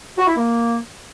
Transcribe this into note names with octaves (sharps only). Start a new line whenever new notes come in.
F#4
E4
A#3